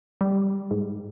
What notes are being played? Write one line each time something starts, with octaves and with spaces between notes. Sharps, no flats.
G3
G#2